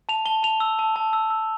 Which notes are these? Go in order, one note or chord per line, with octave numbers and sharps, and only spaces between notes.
A5 F7
A5 G7
A5 F7
E6
A5
A5
E6
E6